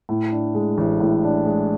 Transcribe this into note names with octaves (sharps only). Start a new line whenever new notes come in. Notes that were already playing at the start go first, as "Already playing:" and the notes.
A2
D4
G#3
A1
A2
D4
G#3